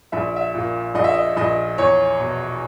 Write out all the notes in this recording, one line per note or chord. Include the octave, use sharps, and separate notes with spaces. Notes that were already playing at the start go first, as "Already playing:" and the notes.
A#1 E5
E5
A#2
A#1 D#5
E5
D#5
A#1 D#5
E2 C#5
B2